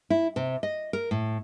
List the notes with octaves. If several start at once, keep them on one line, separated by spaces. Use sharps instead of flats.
E4
C3
D#5
A#4
A2